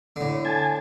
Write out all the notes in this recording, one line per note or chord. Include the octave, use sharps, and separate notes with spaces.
A2 D3
G#5 A5